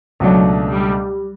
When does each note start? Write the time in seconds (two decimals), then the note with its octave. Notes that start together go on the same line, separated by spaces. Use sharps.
0.20 C#2 B2 F#3 A3 D4
0.72 G3